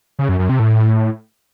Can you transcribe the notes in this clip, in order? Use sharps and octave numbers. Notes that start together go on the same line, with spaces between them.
C#3
F#2
F#2
C3
A2